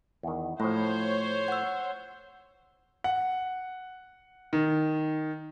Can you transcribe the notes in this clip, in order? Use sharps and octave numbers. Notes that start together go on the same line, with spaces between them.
E2 D#3
A2 F3 A3 C5 C#5
F#5 E6
F#5
D#3